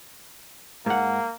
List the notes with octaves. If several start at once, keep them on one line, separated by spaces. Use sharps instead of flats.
G#2 A#3 F#5